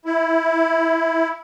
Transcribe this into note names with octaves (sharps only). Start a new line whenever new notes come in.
E4